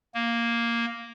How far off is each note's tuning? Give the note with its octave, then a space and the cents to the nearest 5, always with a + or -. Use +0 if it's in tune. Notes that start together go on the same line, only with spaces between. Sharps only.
A#3 +0